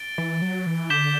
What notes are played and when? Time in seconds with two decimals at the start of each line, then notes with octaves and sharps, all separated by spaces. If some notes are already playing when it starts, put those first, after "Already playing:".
Already playing: A6 D7 G7
0.18 E3
0.42 F#3
0.66 E3
0.90 D3 D6 G6 B6 E7 G7